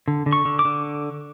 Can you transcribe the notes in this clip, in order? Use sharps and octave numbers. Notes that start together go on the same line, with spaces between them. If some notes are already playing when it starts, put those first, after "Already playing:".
D3
D3
C#6
D3
D6
D3